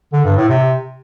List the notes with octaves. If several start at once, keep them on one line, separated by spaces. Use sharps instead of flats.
D3
G2
A2
C3